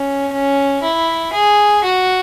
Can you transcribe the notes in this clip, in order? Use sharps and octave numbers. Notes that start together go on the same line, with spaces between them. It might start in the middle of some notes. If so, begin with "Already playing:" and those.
Already playing: C#4
C#4
E4
G#4
F#4